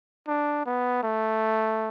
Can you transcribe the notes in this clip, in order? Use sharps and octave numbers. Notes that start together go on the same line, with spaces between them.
D4
B3
A3